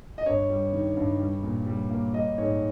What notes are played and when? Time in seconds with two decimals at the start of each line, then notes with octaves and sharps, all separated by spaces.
0.18 D#5
0.26 G2 C#5
0.50 G3
0.72 D#3
0.97 G2
1.20 G3
1.43 A#2
1.66 G3
1.90 A#3
2.13 G3 D#5
2.38 G#2 C#5